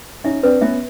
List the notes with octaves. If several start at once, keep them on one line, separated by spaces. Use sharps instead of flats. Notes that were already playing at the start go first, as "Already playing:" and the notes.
C#4 D#4 E5
C4 D4 B4
B3 C#4 E5